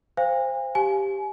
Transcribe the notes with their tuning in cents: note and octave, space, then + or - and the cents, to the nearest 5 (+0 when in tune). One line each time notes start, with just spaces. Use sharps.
C5 +0 F5 +0 G#5 -45
G4 +0 G#5 +30